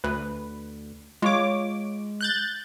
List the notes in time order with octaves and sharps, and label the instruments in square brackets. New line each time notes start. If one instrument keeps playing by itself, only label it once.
[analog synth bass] D2 [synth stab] B4
[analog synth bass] G#3 [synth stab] F4 C#5 D6
[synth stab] F#6 G6 A6